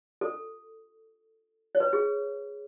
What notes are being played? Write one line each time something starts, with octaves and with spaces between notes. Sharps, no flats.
A4
C#5
B4
G#4